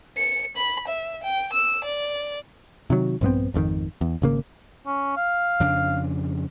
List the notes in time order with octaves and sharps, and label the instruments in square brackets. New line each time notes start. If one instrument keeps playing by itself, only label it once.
[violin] C#7
B5
E5
G5
E6
D5
[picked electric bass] C3 D#3 F#3
A#1 G2 B3 C4
G#1 F2 D3 D#3
E2
G#1 C#3 A#3
[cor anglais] C#4
F5
[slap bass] F2 C#3 D4